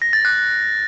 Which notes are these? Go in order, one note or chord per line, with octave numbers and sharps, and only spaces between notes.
A#6
A6
F#6